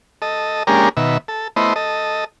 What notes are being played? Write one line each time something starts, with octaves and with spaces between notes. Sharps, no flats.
A4 D#5
G#3 A#3 C#4 D4 G4 A#4
B2 D#3 E5
A4
A3 B3 E4 C5 D#5
A4 D#5